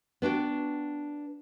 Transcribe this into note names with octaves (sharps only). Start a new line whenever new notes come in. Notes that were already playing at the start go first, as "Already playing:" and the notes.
B3 D4 F#4 G5